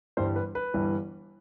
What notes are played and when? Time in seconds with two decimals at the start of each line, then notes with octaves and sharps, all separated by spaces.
0.17 G1 G2 E3 G3 C5
0.36 B4
0.55 B4
0.74 G1 G2 E3 G3